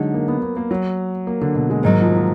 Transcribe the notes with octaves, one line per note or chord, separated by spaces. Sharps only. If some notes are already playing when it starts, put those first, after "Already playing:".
Already playing: D3 F#3 G#3 D#4
A#3
B3
A#3
A#3
F#3
A#3
D3
B2
G#3
G#2 D#3 F#3 A#3
F3
F3